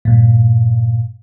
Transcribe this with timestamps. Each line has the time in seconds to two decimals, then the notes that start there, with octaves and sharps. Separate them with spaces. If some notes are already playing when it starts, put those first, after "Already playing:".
0.05 G2 A#2